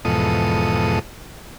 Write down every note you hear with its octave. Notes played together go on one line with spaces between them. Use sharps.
E2 G#2 B2 F3 A4 D#6